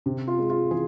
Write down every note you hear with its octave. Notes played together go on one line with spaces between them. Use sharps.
C3
F4
G#3
F4
E3 G#4